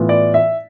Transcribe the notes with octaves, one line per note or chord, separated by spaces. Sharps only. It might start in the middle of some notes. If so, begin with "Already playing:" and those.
Already playing: A2 E3 B3 F4
D5
E5